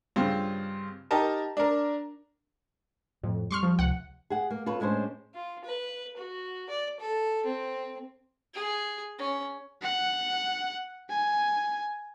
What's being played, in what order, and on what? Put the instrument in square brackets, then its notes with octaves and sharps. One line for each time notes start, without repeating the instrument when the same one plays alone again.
[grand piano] G2 C#3 C4 F4
D#4 G4 A#4 A5
D4 A#4
[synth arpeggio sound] F2 [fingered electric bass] A2
[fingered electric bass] G3 [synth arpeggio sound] C6 C#6 F6
[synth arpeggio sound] F3
[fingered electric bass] C#2 C3 [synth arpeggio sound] F#5
[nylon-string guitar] G#4 F#5
A#3
F4 A4 B4 C#5
A2 G#3 C#4 D4 C5
[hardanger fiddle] F4
B4
F#4
D5
A4
C4
G#4
C#4
[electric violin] F#5
G#5